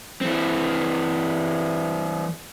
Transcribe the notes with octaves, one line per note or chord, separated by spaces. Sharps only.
E3 C4